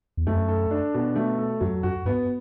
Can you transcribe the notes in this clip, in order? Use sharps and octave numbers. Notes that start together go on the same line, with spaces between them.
E2
F#2 A3
A4
D4
B2
A3
A4
F#2 F#3
F#2 F#4
G2 B3